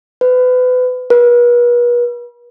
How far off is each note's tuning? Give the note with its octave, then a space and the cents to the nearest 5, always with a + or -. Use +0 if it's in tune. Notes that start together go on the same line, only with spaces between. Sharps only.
B4 +30
B4 -40